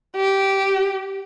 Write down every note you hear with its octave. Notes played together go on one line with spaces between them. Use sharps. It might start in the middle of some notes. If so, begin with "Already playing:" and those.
G4